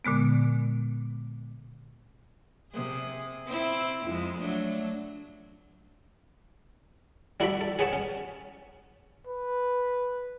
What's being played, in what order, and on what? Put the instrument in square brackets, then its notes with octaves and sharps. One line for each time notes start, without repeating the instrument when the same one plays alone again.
[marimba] A#2 D3 G#3 B3
[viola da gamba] C3 G#4
C4 E4
F2 G#3
F#3 A3 D4
[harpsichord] G3 E4 F#4 A4 D5 B5
A4
G#4 B4 C#5 F#5 A5
C#4
[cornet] B4